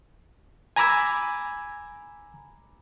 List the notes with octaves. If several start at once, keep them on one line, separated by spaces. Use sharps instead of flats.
G#5 A#5 B5 D6 E6 G#6